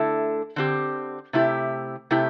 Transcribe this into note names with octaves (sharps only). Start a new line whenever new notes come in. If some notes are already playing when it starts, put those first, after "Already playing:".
Already playing: D3 A3 E4 A4
D3 C4 G4
C3 A3 E4 G4
C3 A3 E4 G4